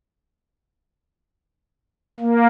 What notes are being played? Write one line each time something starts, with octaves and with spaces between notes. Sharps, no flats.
A#3